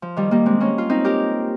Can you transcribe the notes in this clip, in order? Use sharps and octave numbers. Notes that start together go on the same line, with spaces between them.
F3
D#3 G3
G3 A#3
G#3 C4
A#3 C#4
F4
C4 D#4
G4 A#4